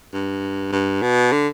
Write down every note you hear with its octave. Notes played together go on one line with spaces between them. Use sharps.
G2
G2
B2
D3